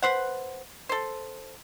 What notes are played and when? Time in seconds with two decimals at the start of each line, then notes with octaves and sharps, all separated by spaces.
0.03 B4 C5 F#5
0.89 A4 C5